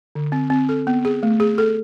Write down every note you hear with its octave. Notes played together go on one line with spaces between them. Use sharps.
D3
C4
C4
A4
B3
G#4
A3
G#4
A4